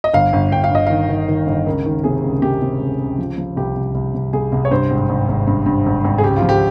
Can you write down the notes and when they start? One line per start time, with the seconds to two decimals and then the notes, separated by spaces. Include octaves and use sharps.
0.04 D#5
0.13 G1 F5
0.33 G1
0.52 G1 G5
0.64 F5
0.71 G1 D#5
0.87 D#3 F5
1.09 D#3
1.28 D#3
1.47 G1
1.67 C#2 A#4
1.86 D#3
2.04 C3 G#4
2.23 C#2
2.42 C3 G4
2.62 C3
2.80 C#2
2.99 C#2
3.18 F3
3.38 F3
3.56 C2 G4
3.76 C2
3.95 C2
4.14 C2
4.33 C2 G#4
4.52 C2
4.65 C#5
4.71 G2 C5
4.91 G#1
5.09 G#1
5.29 G#1
5.47 G2
5.66 G2
5.86 G#1
6.04 G#1
6.18 G#4
6.23 C#2 G4
6.37 F4
6.42 F3
6.49 G4